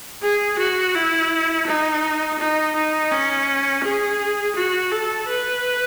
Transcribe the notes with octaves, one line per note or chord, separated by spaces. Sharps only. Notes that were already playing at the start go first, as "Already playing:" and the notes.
G#4
F#4
E4
D#4
D#4
D#4
C#4
G#4
F#4
A4
B4